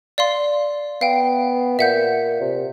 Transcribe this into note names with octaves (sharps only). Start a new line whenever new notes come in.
D5 F5 C6
B3 F5 G5
A#2 E5 F#5 G6
C3